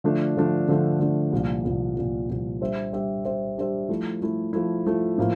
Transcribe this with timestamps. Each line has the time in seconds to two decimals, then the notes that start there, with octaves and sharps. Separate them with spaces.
0.04 D3 F3 A3 D4
0.36 D3 F3 A3 D4
0.68 D3 F3 A3 D4
1.00 D3 F3 A3 D4
1.32 C2 A#2 F3
1.64 C2 A#2 F3
1.97 C2 A#2 F3
2.28 C2 A#2 F3
2.61 G3 D4 G4 C5 E5
2.93 G3 D4 G4 C5 E5
3.25 G3 D4 G4 C5 E5
3.58 G3 D4 G4 C5 E5
3.89 F3 A3 E4
4.22 F3 A3 E4
4.53 F3 A3 E4
4.86 F3 A3 E4
5.18 A2 F3 A#3